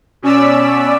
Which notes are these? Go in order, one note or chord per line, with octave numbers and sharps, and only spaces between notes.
B2 C#4 D5 E6 B6